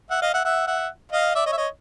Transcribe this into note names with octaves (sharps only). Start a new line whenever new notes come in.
E5 F#5
D#5 F5
E5 F#5
E5 F#5
E5 F#5
D#5 F5
D5 E5
C#5 D#5
E5
C#5 D#5